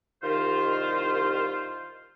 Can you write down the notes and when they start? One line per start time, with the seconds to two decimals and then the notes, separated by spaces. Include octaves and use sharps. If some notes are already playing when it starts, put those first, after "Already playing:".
0.23 C2 D#3 F4 C5